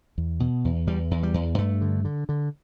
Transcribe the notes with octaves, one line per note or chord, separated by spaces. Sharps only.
E2
B2
E2
E2 G3
E2
G3
E2
G2 A3
D3
D3
D3